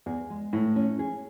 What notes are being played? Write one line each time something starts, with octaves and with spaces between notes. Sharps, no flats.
E2 G#4
G#3
A2 E4
C#4
G#4